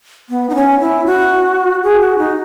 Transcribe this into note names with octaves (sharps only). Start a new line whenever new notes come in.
B3
D#4
C#4
E4
F#4
G#4
F#4
D#4